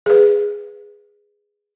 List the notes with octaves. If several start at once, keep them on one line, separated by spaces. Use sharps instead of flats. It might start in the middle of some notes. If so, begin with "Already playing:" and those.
G#4 B4